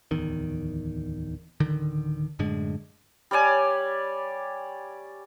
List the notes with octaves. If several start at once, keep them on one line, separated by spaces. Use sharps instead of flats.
D1 E2 D#3
D1 D3 D#3
F#2 A2 D3 G#3
G3 C#5 D5 G#5